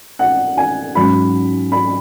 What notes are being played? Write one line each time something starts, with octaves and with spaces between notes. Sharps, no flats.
F#5
G#5
G#2 F#3 C#4 B5
B5